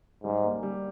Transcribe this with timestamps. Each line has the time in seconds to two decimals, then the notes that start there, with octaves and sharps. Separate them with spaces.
0.23 G#2 G3
0.43 A#3
0.63 G3